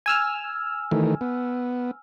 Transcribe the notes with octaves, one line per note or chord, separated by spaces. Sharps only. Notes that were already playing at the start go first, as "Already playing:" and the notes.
G#5 E6 F6
D#3 E3 A3
B3